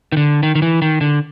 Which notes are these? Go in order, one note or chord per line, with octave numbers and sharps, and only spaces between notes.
D#3
D3
D#3
D#3
E3
D#3
D3